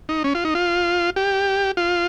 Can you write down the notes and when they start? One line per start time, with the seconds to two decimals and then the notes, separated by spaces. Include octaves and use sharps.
0.09 D#4
0.24 C#4
0.35 F4
0.45 D#4
0.55 F4
1.16 G4
1.77 F4